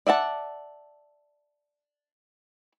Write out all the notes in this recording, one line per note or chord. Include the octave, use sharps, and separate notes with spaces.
D5 E5 F#5 A5